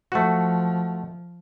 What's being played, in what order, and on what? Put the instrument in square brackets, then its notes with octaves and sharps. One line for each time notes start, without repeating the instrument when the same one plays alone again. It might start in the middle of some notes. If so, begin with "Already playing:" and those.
[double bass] F3 [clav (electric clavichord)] A3 F#4